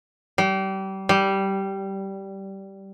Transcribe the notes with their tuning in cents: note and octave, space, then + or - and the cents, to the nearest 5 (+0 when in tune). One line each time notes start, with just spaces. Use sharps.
G3 -30
G3 -10